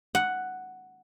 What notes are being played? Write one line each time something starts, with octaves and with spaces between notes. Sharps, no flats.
F#5